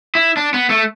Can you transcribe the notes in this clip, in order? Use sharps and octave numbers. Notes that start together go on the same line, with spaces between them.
E4
D4
B3
A3